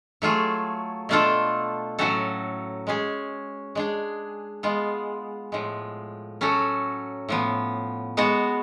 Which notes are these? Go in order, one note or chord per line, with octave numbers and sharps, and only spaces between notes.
F#3 A3 F4 G#4
B2 A3 D4 F4 A4
A2 F#3 C#4 F#4 A4
G#3 C#4 G#4
G#3 D4 G#4
G#3 B3 F4
A2 F3 G#3
F#3 C#4 F#4 A4
A2 F3 B3
G#3 B3 F#4